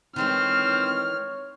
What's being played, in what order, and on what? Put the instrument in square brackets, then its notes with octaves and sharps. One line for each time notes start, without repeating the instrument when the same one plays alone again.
[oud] D#3 E3 G#3 [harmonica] C4 [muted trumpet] C#5 [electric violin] F6